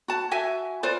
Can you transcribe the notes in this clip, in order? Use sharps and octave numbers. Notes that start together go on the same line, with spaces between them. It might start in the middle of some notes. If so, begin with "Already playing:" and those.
F#4 A5
F#4 E5 G#5
F4 B4 C5 D5